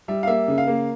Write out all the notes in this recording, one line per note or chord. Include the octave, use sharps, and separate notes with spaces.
G3 E5
F5
A#3 E5
C#3
F5
A#3